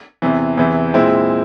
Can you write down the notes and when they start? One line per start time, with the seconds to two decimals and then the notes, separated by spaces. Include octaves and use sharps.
0.22 E2 C3 E3
0.57 E2 C3 E3
0.94 A#2 G#3 C4 E4